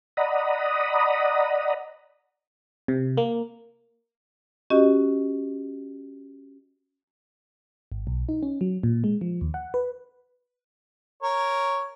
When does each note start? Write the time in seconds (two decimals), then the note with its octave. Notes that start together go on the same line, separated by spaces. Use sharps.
0.17 D5 D#5 F#5 A#5 B5 D#6
2.88 C3
3.17 A#3
4.70 C#4 F#4 G4 D#5
7.92 G#1
8.07 B1
8.29 D#4
8.43 C#4
8.61 F#3
8.83 A#2
9.04 G#3
9.21 F3
9.41 D#2
9.54 F#5
9.74 B4
11.23 A#4 C#5